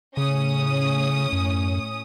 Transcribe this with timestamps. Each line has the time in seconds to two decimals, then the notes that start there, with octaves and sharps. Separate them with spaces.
0.17 A2 C#3 C#4 D#6
1.32 F#2